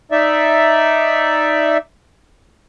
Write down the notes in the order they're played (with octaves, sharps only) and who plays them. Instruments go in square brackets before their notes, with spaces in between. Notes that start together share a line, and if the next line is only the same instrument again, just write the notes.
[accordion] D#4 D5 E5